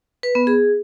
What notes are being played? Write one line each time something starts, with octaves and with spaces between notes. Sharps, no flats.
B4
B3
G#4